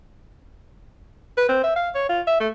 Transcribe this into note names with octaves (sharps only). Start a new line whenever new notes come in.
B4
C4
E5
F5
C#5
F4
E5
A3